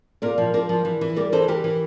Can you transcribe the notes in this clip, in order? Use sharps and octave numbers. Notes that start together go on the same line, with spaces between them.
A#2 A#4 D5
F3
F3 A#4 D5
F3
E3
E3
G3 A#4 D5
E3 A4 C5
E3 G4 A#4
E3